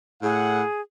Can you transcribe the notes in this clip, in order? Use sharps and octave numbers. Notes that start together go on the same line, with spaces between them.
A2 G#4 F#5